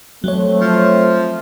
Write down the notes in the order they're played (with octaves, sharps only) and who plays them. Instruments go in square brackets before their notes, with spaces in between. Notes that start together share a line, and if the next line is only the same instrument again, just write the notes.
[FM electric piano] F#3 C#5 [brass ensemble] A3 C4
[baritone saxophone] F3